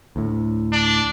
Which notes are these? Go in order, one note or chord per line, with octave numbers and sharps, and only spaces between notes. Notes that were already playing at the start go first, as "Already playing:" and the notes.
D2 A2
D4